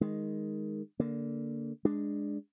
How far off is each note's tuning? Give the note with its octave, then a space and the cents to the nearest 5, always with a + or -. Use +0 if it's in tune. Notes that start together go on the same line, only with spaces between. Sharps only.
D#3 +0 G#3 -5
D3 -10 A#3 +0
G#3 +0 D4 +5